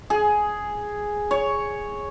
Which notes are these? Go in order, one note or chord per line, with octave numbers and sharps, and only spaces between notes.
G#4
C#5